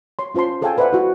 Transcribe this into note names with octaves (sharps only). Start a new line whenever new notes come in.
C#5 C6
C#4 F4 C5 A5 C6
G#4 A4 C#5 F5 G5 G#5
A4 B4 C5 D5 E5 F#5
E4 F#4